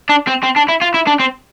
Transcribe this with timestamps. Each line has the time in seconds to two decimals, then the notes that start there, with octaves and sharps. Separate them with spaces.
0.09 D4
0.27 C4
0.43 C4
0.56 D4
0.68 E4
0.81 F4
0.94 E4
1.07 D4
1.20 C4